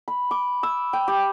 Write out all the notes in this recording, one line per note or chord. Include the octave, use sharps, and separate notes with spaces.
B5
D6
E6
G5
G4